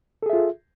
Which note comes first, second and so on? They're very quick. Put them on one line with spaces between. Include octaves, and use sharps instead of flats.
A4 G#4 E5 F4